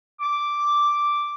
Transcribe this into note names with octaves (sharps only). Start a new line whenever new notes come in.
D6